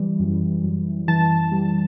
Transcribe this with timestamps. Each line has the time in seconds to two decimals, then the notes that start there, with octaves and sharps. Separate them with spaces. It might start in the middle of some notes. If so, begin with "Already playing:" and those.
Already playing: E3 G3
0.19 F#2
0.64 F#2
1.08 E3 A5
1.52 G3